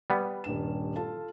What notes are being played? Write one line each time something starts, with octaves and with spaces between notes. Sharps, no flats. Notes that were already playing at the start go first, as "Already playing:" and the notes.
G3 B3
D#1 G2 E7
F4 A4 A5